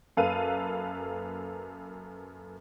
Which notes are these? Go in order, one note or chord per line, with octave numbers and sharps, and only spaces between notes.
F#2 A#3 A4 B4 F5 D#7